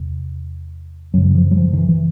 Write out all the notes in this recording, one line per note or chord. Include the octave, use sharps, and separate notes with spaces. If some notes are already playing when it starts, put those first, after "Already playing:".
Already playing: E2 C3
F#2 C#3 F#3
F3
F#3
F3
D#3
E3
E3